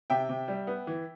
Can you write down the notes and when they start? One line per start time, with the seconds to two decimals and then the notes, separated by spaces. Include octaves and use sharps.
0.10 C3 E5 G5
0.29 C3
0.48 G3
0.67 B3
0.87 E3